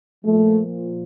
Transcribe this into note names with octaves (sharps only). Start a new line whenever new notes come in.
A#2 F3 A3